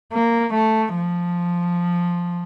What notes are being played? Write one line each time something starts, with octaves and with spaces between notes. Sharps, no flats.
A#3
A3
F3